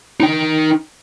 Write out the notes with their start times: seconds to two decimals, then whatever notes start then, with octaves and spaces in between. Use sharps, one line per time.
0.20 D#4 G5